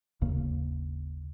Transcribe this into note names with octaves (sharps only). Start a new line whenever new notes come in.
G1 D#2 C#3 A#3